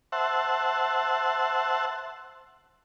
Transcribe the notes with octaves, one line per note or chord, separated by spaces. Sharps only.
C5 E5 F#5 A5